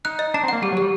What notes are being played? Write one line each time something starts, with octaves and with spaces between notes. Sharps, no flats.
D#4 F#6
D#5
D4 A#5
C4
A#3 F#5
G3 G4
F#3
G3 G4